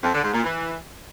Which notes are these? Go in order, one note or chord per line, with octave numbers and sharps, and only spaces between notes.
F2
D3
G#2
A#2
E3